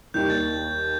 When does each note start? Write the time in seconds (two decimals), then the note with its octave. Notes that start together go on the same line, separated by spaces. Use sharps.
0.14 D#2 D#3 G3 G6
0.30 A6